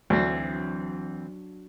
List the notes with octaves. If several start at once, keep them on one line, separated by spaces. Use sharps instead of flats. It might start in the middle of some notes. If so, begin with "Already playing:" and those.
D2 E3 F#3 C4 D4